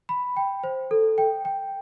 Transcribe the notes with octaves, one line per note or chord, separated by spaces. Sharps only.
B5
G5
C5
A4
G5
G5